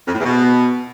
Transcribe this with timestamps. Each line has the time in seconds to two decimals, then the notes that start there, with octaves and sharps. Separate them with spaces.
0.08 F2
0.13 A2
0.19 E2
0.25 B2